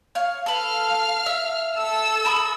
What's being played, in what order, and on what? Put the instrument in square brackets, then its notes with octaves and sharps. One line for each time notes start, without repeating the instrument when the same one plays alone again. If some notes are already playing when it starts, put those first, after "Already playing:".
[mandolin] C#5 F5
[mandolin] A4 B4 [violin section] F5 F6
[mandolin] E5
[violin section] A4 E6
[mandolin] A#4 B5 D#6